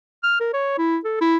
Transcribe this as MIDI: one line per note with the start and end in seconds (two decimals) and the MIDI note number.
0.24 0.37 89
0.40 0.49 70
0.53 0.77 73
0.78 0.98 64
1.04 1.18 69
1.21 1.38 64